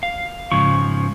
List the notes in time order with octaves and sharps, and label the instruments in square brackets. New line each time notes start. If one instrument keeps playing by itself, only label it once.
[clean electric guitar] F5
[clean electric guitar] G#2 C#3 F3 [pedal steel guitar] C#6